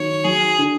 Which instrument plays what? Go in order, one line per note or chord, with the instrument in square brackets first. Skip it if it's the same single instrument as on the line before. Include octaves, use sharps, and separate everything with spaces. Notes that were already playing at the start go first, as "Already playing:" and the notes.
Already playing: [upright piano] D#3 F#3 [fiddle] C#5
[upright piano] F#3 [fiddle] G#4
[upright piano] D3